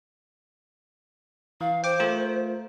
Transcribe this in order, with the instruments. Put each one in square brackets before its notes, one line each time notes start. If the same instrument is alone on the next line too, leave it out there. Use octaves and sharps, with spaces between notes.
[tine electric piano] E3 [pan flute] F5
[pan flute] C5 [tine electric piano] G5 D6
[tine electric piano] A3 F4 A#4